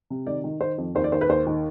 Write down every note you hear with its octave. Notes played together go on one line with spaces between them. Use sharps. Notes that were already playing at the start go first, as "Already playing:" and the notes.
C3
D#3 D5
D#3
D#3 C5
F2
D#2 C5
D5
D#2 C5
B4
D#2 C5
D#3